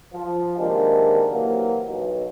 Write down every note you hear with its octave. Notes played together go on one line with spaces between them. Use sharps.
F3
C3 D#3 G#3 A#3 D4
C3 E3 F#3 A#3
B1